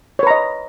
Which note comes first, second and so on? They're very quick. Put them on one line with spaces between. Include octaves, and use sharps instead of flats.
C#5 B4 A#5 D#5